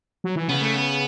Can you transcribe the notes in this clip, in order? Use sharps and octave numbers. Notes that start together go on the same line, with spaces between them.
F#3
E3
C#3 B3
A3
B3